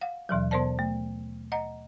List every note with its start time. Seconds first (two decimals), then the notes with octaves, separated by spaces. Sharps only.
0.01 F5 F#5
0.29 D#2 B2 E3 F#3
0.51 B2 B3 A#4 C5 D5 A5
0.79 A3
1.52 D#5 F#5 A#5